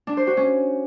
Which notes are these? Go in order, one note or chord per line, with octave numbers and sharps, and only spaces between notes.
D4
C5
F#4
C#4